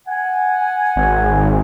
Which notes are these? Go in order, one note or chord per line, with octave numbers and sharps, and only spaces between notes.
F#5 G#5
G#1